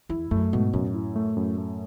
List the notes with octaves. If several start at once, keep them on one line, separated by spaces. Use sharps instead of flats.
E2 E4
F#2 A3
G#2 B2
F#2 A2
E4
A3
F#2
A3